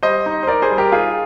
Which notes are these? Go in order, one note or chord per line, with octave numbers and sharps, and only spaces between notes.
G3 C5 D#5
D#4
C5
D#4 A#4 D5
G#4 C5
G3
G4 A#4
D#4 F4 G#4